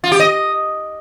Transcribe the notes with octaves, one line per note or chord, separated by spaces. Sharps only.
F4
G4
D#5